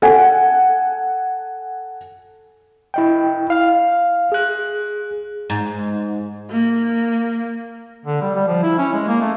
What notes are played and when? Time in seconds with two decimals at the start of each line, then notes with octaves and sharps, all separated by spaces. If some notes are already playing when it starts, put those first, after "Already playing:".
0.02 A4 F#5 G#5
2.94 E4 D#5 G5
3.50 F5 F6
4.32 G#4 F#6
5.50 G#2
6.51 A#3
8.05 D3
8.22 G3
8.36 G3
8.48 F3
8.63 E4
8.78 C#4
8.93 G#3
9.08 A#3
9.21 A3